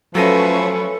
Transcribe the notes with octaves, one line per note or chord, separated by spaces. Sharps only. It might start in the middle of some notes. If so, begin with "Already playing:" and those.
F3 F#3 A3 C#4 A4 B4 A#6 D#7